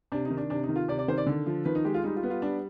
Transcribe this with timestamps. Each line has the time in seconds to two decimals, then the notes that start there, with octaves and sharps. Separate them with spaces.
0.12 C3 D4
0.25 D#4
0.31 D#3
0.37 D4
0.50 C3 D4
0.63 D#4
0.69 D#3
0.76 F4
0.88 C3 D5
0.99 D5
1.08 D#3 C5
1.18 D5
1.26 D3
1.46 F3
1.65 D#3 B4
1.75 D#4
1.85 G#3 G4
1.94 F4
2.04 G3 D#4
2.16 F4
2.23 B3
2.30 F4
2.42 G3 D4